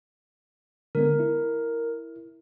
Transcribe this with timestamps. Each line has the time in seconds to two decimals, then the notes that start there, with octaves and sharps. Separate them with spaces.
0.95 D3 G#3 B3 A#4
1.20 E4